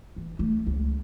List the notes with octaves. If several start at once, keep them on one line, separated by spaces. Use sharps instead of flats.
E3
A3
C#2